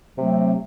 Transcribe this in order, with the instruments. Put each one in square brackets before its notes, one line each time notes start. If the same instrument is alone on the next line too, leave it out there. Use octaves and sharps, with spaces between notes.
[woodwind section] C3 F#3 A3 C4